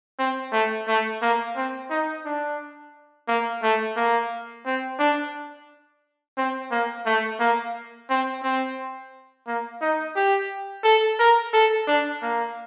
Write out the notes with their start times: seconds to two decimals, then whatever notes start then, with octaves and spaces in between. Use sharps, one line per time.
0.19 C4
0.52 A3
0.87 A3
1.22 A#3
1.56 C4
1.90 D#4
2.25 D4
3.28 A#3
3.63 A3
3.97 A#3
4.66 C4
4.99 D4
6.38 C4
6.71 A#3
7.06 A3
7.40 A#3
8.10 C4
8.43 C4
9.47 A#3
9.81 D#4
10.16 G4
10.84 A4
11.19 A#4
11.53 A4
11.87 D4
12.22 A#3